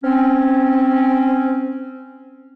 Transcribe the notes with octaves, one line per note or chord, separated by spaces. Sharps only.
C4 C#4